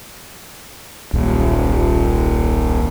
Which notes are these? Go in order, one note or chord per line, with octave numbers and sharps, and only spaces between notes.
D#1 B1